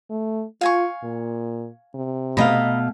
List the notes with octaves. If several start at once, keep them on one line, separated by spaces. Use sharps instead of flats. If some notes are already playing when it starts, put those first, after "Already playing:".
A3
F4 F5 G#5 C#6
A#2
C3
B2 A3 D#5 F5 A#5 B5